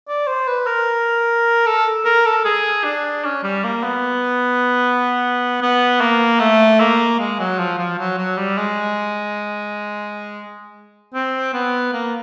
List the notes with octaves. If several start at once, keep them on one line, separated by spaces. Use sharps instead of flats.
D5
C5
B4
A#4
A4
A#4
A4
G#4
D4
C#4
G3
A#3
B3
B3
A#3
A3
A#3
G#3
F#3
F3
F3
F#3
F#3
G3
G#3
C4
B3
A#3